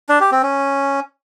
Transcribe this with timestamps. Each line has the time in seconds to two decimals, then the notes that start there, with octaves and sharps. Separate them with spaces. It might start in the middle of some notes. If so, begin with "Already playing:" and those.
0.09 D4
0.20 G4
0.32 C4
0.43 C#4